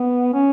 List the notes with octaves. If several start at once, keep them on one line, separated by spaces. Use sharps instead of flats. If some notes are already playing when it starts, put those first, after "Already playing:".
Already playing: B3
C#4